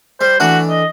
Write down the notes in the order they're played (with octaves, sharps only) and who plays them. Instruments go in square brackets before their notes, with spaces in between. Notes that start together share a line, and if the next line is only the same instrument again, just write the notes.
[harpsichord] G3 [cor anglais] C5
[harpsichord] E3 A3 D4 [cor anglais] F#4
[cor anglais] D#5